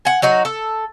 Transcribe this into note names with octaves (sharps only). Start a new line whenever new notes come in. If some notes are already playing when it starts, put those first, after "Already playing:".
F#5 G#5
F#3 D#4 F#4
A4